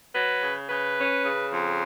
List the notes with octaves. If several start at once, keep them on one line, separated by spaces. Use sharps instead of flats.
F#3 B4
C#3
C#3 B4
C#4
C#3
F2